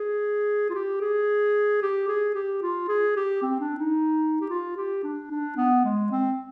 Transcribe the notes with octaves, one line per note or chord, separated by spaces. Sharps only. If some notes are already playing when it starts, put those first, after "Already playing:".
Already playing: G#4
F4
G4
G#4
G4
G#4
G4
F4
G#4
G4
C4
D4
D#4
G4
F4
G4
D4
D4
B3
G#3
C4